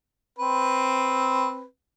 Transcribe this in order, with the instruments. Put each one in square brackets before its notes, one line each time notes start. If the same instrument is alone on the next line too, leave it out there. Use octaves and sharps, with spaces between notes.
[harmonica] C4 B4